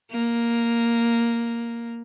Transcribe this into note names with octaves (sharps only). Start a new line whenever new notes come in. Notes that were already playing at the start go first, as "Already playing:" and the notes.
A#3